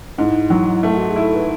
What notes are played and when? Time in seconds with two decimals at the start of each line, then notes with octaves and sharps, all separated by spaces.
0.17 G#2 E4
0.50 F#3
0.83 A3
0.97 F#4
1.10 G#4
1.16 E4
1.23 A4
1.35 B4